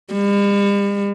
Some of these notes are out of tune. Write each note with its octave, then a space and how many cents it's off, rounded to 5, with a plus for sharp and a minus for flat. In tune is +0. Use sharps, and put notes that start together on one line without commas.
G3 +45